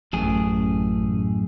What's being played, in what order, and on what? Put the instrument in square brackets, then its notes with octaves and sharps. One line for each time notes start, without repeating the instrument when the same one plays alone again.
[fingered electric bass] A1 [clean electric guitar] F#2 A2 G#4